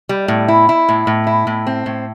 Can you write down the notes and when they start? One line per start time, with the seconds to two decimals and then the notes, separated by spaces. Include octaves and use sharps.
0.09 G3
0.28 A2
0.48 E4
0.69 E4
0.89 A2
1.07 A2
1.27 E4
1.47 A2
1.67 C4
1.86 A2